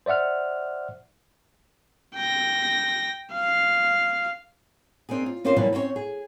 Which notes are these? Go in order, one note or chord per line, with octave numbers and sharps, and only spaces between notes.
C5 D5 E5 F#5 F6
G5 A#6
F5
A#3 C4 D4 D#4 G#4
F4
C4 C#4 F4 G4 A#4 C5
B2 D#3 E3 F#3 G3 A#3
C4 C#4 E4 C#5
G#4